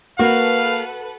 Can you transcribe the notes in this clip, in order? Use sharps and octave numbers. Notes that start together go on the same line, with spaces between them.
A#3 F#4 A4 B4 F5 F#5